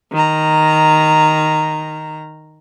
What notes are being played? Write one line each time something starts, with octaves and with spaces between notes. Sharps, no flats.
D#3 A#5